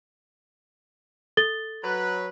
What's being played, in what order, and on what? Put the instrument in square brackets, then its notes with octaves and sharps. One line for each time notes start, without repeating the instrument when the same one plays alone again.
[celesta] A4 A6 G7
[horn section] F#3 B4